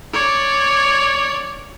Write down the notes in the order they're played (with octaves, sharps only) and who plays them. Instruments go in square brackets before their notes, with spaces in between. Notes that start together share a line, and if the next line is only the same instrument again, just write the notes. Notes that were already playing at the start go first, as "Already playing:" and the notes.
[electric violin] C#5 D5